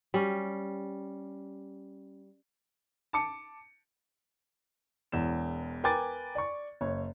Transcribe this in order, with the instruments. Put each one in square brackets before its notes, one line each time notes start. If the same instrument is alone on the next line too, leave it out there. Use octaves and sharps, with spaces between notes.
[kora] G3 C#4
[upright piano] A5 D6 C#7
E1 E2 E7
A#4 B4 G5 G#5 D6 A6
D5 C#6
F#1 C#5